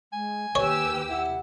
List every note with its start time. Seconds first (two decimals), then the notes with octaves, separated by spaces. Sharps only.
0.13 G#3 G#5
0.55 D#2 G4 B4 C#5 E6
1.09 E4 F#5